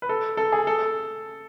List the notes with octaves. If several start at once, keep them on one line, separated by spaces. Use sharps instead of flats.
B4
A4
A4
G#4
A4